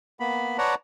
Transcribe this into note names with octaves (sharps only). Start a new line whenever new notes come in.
A#3 B3 B5
B4 C#5 D5 F#5 A5 A#5